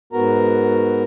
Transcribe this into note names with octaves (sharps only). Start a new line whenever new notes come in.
G#2 B3 F#4 A#4 A#5